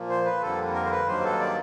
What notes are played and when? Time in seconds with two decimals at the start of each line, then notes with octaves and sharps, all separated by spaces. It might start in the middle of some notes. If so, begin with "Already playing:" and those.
Already playing: A#2 F3 A#3
0.09 C5
0.25 B4
0.41 F2 D3 G3 A#3 A4
0.74 A#4
0.85 C5
0.91 B4
1.07 G2 D#3 F#3 A#3 C5
1.24 A4
1.40 D5